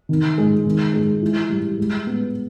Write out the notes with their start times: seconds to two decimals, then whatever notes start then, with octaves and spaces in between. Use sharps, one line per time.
0.09 D#3
0.38 G#3
0.65 D#3
0.93 G#3
1.22 E3
1.50 G3
1.78 G#3
2.07 B3